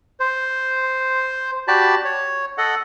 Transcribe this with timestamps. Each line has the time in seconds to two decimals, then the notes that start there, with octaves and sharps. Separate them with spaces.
0.20 C5
1.68 F#4 G4 D5 A5 B5
2.05 C#5
2.58 A4 D#5 F#5